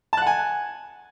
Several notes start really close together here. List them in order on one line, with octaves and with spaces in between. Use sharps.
A5 F#6 F#5 G#5